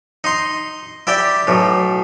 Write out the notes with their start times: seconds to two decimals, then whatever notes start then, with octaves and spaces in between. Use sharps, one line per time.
0.24 D#4 C6
1.07 E4 G4 D5 G5
1.47 B1 A2